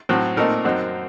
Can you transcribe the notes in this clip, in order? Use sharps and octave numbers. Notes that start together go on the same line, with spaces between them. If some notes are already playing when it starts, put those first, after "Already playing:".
A2 F#3 C4
A#2 A3 C4 D#4 A#4
F#2 F#3 C4 D#4